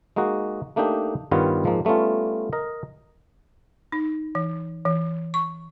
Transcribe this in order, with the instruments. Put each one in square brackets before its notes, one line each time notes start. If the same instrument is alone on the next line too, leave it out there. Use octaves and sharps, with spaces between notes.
[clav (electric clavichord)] G#3 A#3 D#4 F#4
A3 A#3 D4 D#4 G4
G2 D#3 G3 B3 F4 C#5
G#2 F3 G#3 A#3
G3 A3 B3 C#4 F4
A#4 D#5
[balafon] D#4
E3
E3
C#6